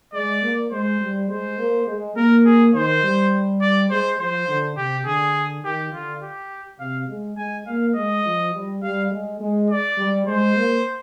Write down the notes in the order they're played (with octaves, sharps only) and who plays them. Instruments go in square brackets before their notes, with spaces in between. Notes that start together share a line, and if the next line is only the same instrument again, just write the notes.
[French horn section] G#3 [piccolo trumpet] D5
[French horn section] A#3
[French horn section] G#3 [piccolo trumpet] C5
[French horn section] G3
[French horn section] G#3 [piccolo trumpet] C5
[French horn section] A#3
G#3
[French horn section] A#3 [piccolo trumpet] A#4
[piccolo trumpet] G#4
[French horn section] D#3 [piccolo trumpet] C5
[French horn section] G3
[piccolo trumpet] D5
[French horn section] G#3 [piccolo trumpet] C5
[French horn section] F3 [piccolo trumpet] C5
[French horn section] D3
[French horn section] C3 [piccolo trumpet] G4
[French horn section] D3 [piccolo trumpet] G#4
[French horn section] D#3 [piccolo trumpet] G4
[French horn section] D3 [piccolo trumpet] F4
[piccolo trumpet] G4
[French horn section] C3 [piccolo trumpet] F5
[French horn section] G#3
[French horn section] G#3 [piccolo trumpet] G#5
[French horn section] A#3 [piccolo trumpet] F5
[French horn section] G#3 [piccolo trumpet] D#5
[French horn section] F3
G3
[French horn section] G3 [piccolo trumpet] F5
[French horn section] G#3
G#3
[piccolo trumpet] D5
[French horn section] G3
[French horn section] G#3 [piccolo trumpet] C5
[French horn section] A#3